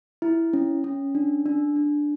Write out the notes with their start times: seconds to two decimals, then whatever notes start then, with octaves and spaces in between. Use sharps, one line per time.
0.22 E4
0.53 C#4
0.84 C#4
1.15 D4
1.46 D4
1.76 D4